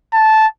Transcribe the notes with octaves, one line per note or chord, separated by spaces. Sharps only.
A5